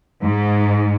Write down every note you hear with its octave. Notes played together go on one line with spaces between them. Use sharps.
G#2